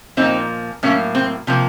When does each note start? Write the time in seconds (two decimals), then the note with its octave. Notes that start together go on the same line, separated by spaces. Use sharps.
0.17 A#2 F3 A#3 C4 D#4
0.83 A2 F#3 A#3 C#4
1.15 C4
1.47 C3 F3 A#3